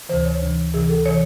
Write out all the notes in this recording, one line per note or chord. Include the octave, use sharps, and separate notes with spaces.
D2 C3 E3 C5
C#5
D2 C3 E3
D2 C3 E3 G#4
A4
C3 E3 C#5